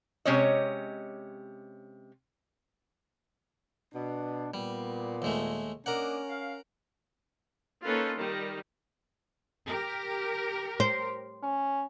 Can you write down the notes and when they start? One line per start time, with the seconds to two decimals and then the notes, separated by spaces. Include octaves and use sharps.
0.25 C3 G#3 C#4 C#5 D#5
3.94 B2 D4
4.54 A#2 G3 B3
5.22 D#2 G#3 A3
5.86 A#3 C#4 D4 A#4 D#5 F#5
6.29 F5
7.85 A#3 C#4 D#4 F4 A4 B4
8.16 D#3 G3
9.67 G4 A#4
10.80 C5
11.43 C#4